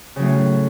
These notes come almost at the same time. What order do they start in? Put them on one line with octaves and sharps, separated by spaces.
C#3 F#3 A2 C#4